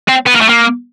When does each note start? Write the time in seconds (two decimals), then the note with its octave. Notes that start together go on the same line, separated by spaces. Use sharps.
0.09 C4
0.26 B3
0.35 A#3
0.41 A3
0.49 A#3